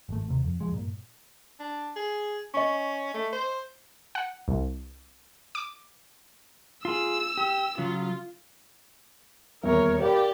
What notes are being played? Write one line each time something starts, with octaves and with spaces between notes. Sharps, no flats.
G#1 A3
D#2 C3
F2
F3 G#3
G2 A#2
D4
G#4
C#4 D#5 C#6
A3
C5
F#5
C2
D6
F4 G#4 E6
G4
C#3 F#3 F4
D#1 E2 A#4 C#5 E5
G4 A#4 D5 F5 B5